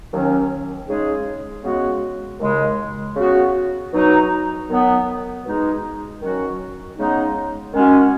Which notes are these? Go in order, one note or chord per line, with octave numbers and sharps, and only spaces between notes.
D#2 D#3 F#3 C#4
C#3 G#3 D#4 G#4
C#3 G#3 B3 F#4
D#2 C#3 G#3
C#3 B3 F#4
B2 F#3 D#4 F#4
D#3 F#3 B3
B2 G#3 D#4 G#4
D#3 F#3 C#4 F#4
C#3 G#3 B3 D#4
D#3 G#3 C#4 F#4